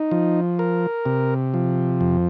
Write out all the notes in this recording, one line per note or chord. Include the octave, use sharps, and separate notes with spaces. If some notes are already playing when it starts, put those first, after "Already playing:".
Already playing: D#4
F3
A#4
C3
F3
F2